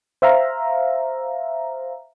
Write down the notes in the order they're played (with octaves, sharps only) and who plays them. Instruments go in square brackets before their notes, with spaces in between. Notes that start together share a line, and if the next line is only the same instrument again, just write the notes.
[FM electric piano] C5 E5 F5 A#5